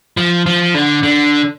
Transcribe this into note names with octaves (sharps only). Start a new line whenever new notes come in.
F3
F3
D3
D3